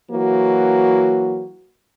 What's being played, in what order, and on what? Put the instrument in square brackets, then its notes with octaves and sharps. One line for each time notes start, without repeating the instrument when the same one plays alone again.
[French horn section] E3 F#3 A#3 F#4